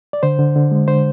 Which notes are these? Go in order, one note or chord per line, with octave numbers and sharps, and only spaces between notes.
D5
D3 C5
D3
D3
G#3
D3 C5